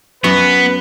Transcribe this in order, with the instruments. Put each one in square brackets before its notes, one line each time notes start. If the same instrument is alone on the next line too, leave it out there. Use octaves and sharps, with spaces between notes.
[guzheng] F#2 F#4 [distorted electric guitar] B3 [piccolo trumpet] B4